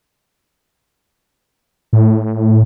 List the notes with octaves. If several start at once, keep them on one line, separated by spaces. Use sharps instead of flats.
A2